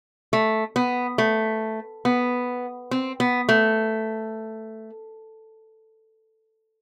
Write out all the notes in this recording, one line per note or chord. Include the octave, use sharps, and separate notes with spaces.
A3
B3
A3
B3
C4
B3
A3